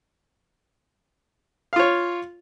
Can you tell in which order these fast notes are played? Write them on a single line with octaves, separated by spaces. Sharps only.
F5 F4 C#5